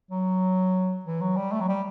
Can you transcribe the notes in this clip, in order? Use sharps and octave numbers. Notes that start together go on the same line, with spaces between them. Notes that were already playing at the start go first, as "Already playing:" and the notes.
F#3
E3
F#3
G3
A3
F#3
G3